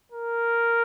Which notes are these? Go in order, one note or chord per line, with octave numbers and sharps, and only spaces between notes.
A#4